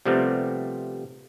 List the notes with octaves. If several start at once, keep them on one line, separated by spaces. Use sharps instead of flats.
C3 F3 G3 A3 B3 C4